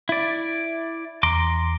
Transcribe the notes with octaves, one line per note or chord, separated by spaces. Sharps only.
E4 D5
E2 A#5 C6 D6